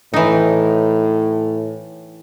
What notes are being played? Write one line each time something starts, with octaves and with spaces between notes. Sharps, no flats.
A2 E3 D#4